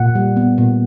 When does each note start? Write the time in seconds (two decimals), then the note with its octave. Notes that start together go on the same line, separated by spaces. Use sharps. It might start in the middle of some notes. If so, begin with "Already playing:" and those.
Already playing: A#2 F#5
0.15 G3
0.37 B3
0.58 A#2